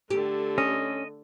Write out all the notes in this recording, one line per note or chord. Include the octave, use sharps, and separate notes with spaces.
D3 A3 G4
C#4 D#5